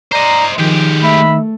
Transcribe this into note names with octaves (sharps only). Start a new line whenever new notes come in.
C5 D5 D#5 A#5
D#3 F3 G#3 G4
A3 E5 B5